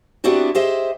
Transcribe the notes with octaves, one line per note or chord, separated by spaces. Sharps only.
B3 C4 D4 E4 F#4 G4
G4 G#4 C5 D#5 E5